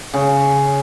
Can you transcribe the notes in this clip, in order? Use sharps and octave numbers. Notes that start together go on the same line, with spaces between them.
C#3